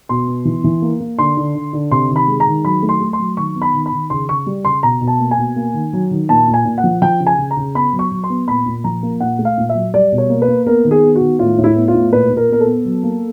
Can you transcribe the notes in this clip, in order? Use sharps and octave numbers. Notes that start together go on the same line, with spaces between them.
B2 C6
B3
E3
E3
A#3
A#3
D3 C6
D3
D3
D3
C3 C6
D#3
B5
G#3
A#5
D#3
F#3 B5
A3
C6
A3
C6
F#3
D#3 C#6
B3
B5
D#3
B5
D#3
C#3 C6
C#3 C#6
G3
C#3 C6
B2 A#5
B2
A5
A#3
G#5
B2
A#3
D#3
F#3
D#3
A#2 A5
A#2
G#5
A#2
F#5
F3
F3 G5
C#3
G#5
C#3
A#5
C#3
B3 B5
F#3
C#6
F#3
C6
B3
A#2 B5
A#2
F3 A#5
A#3
A#2 F#5
A3
F5
A#2
E5
F#3
G3 D5
B2
C#5
A#3
B4
A#3
B3 A#4
D#3
G#4
B3
F#4
D#3
A2 F4
A2
E4
B3
F4
A2
A#2 B4
A#2
A#4
B3 A#4
A4
B3
F#3
A#3